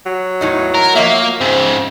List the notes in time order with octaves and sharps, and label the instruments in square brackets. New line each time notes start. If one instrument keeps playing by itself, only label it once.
[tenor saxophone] F#3
[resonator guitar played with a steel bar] E2 A2 D#4
[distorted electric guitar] A#4
[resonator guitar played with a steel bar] F3 D#5 E5 [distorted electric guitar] A#3
[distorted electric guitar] G#2 C#3 [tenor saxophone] C4